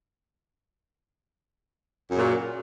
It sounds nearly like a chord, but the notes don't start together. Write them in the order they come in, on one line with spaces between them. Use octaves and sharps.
F#2 C#3 A#2 F#3